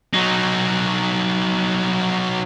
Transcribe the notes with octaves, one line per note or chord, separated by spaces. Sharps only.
F#3 D#4